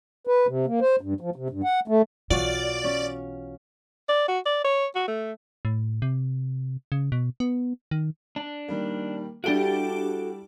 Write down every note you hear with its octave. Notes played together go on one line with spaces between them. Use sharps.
B4
C3
A#3
C5
G2
F3
C3
G2
F#5
A3
B1 E3 F4 F#4 C#5 D5
C#4
D5
F#4
D5
C#5
F#4
A3
A2
C3
C#3
B2
B3
D#3
D4
D#3 G3 A#3
G3 D4 E4 F#4 G4 A4 G5 D7